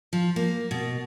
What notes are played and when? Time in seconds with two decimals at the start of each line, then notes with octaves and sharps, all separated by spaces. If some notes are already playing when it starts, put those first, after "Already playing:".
0.13 F3
0.36 A#3
0.71 B2